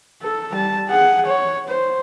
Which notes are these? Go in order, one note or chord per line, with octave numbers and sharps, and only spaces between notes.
A4
G3 A5
G#4 F#5
C#5
C5